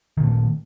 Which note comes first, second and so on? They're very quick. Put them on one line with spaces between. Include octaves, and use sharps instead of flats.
D#3 A#2 A3